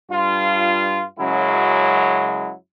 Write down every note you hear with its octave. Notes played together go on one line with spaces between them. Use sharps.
G2 F4
F#2 C#3 F#3 G#3 E4